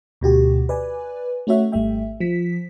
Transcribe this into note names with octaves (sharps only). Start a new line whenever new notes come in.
D2 B2 F#4 G4
B4 D5 G#5
A3 C#4 F#4 C#5 E5 F#5
G#1 G3 A3 E5 G5
F3 B6